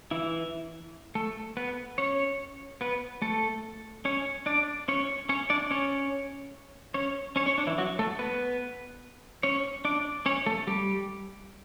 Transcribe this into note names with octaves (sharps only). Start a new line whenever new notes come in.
E3 E4
A3 A4
B3 B4
C#4 C#5
B3 B4
A3 A4
C#4 C#5
D4 D5
C#4 C#5
C#4 C#5
D4 D5
C#4 C#5
C#4 C#5
C#4 C#5
C#4 C#5
D4
E3 E4
F#3 F#4
A3 A4
B3 B4
C#4 C#5
D4 D5
C#4 C#5
A3 A4
G3 G4